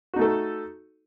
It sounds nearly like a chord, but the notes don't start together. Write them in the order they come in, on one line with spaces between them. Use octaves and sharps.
F#4 D#4 A3 A4